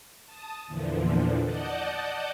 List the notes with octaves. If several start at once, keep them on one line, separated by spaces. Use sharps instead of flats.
A5 D#6
E2 A#2 D3 E3 F3
D5 D#5 F#5 A5 G6